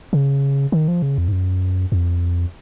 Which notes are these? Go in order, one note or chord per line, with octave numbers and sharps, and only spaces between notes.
C#3
D#3
F3
C#3
F2
G#2
F#2
F2